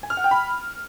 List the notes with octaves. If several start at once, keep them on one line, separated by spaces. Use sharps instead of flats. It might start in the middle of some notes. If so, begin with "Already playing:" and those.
G#5
F6
F#5
G5
B5